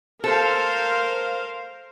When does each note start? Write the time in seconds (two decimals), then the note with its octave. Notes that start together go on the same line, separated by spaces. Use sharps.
0.24 A4 A#4 C5 F5